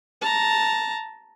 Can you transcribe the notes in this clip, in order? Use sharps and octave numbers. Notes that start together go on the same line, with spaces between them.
A5 A#5